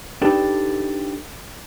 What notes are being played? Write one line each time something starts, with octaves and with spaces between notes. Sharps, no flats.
D4 D#4 G4 A4 B4